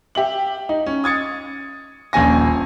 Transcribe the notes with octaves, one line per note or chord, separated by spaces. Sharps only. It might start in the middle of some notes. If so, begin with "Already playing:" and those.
G4 E5 F#7
D#4
C#4
D#6 G#6 A6 C#7
D#1 A#1 C#4 G#5 A#6